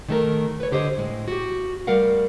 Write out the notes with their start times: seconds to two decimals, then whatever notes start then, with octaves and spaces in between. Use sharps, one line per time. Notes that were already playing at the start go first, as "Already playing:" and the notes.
0.09 D#3 A3 A#4
0.60 B4 C#5
0.72 D3 G4 C5 C#5 D#5
0.97 A2 G#3
1.28 F#4 G4
1.87 G3 A3 A#4 F5 F#5